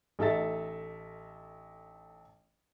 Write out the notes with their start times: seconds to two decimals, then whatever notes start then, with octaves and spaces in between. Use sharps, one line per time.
0.19 A1 D#4 A4 E5 A6